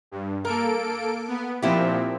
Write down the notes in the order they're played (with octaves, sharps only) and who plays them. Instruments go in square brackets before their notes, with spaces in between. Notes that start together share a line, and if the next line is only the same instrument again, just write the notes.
[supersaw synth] G2
[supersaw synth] A#3 A4 D7 [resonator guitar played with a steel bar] A#4
[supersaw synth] B3
[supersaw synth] A#2 F3 C4 [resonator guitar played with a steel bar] B3 E4 G4